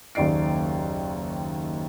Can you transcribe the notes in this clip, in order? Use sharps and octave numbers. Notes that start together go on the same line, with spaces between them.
F#1 D#2 D#3 D5 C7 D7